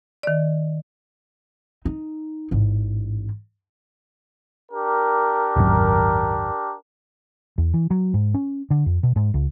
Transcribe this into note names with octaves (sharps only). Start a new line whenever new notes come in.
D#3 D5
D#4
A1 G#2
D4 G4 A#4
D#1 G#1 F#2
E2
E3
F#3
G#2
C#4
D3
F2
B2
G#2
C#2